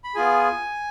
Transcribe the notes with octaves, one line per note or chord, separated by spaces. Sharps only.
B5
B3 F4 G#4 G#5